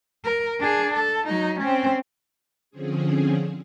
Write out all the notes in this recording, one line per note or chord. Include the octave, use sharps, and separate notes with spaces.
A#4
D4 G#4
A4
F#3 D#4
C4 C#4
D3 F3 C4 C#4 G#4